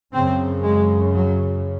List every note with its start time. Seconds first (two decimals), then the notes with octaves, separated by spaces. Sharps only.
0.13 F#2 C#3 C4
0.63 G#3
1.14 F#3